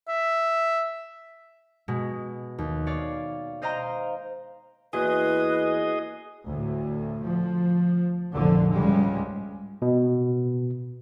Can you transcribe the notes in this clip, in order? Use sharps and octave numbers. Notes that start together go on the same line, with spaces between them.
E5
B2 G#3
D#2
C#5 D5 F5
C5 D#5 F5 G5 A#5
E2 A#3 F#4 G#4 B4 D#5 G#5
D2 A2
F3
F1 A#1 A#2 D3 F3
C#2 G#2 C#3 G3 G#3
B2